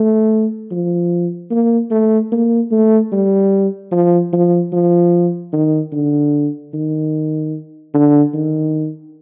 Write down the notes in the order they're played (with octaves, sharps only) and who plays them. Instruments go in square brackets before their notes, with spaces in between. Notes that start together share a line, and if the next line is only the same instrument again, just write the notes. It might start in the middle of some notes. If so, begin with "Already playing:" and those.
Already playing: [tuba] A3
F3
A#3
A3
A#3
A3
G3
F3
F3
F3
D#3
D3
D#3
D3
D#3